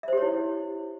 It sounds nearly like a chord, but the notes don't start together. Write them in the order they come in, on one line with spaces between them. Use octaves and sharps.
E5 C5 G4 C#5 E4